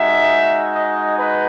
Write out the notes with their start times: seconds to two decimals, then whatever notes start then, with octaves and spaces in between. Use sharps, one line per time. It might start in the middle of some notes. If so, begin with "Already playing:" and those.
Already playing: G#3 D#4 F#4 E5
0.74 D#5
1.18 B4